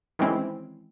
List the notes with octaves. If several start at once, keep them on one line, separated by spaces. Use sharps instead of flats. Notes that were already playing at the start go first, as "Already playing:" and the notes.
D#3 E3 G#3 C4 C#4 E4